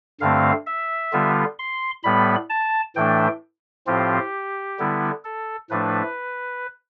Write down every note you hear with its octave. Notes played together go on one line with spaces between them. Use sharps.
G2 D3 A3 C4 F5
E5
D3 G3 B3 F4
C6
A2 G3 B3 B5
A5
A2 E3 A3 D4 G5
A2 F3 C4 F4 G4
D3 G3 B3 E4
A4
A2 F3 A3 D4 B4